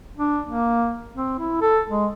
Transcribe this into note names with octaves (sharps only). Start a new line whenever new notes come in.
D4
A#3
C4
E4
A4
G#3